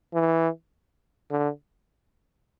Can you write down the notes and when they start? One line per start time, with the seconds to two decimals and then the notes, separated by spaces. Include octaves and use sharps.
0.14 E3
1.31 D3